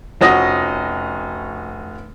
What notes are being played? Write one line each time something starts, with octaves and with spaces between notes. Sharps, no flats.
F1 F3 C#4 F#4 D#6 A#6